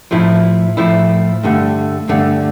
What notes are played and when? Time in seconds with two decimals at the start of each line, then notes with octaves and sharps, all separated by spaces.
0.11 A2 F3 A3 E4
0.77 A2 F3 A3 E4
1.43 G2 D3 A3
2.08 G2 D3 A3